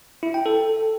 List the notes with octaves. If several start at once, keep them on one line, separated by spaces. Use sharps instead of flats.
E4
G5
A4